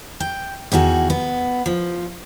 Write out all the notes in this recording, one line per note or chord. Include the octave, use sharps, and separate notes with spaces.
G5
E2 D#3 F#4 G#4
B3
F3